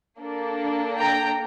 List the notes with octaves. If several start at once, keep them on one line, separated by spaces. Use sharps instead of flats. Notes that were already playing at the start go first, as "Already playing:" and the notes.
A#3 D4 A4
G5 A#5